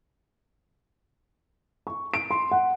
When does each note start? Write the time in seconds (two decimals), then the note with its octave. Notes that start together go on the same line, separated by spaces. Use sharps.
1.87 C#6
2.14 D7
2.31 C6
2.51 F#5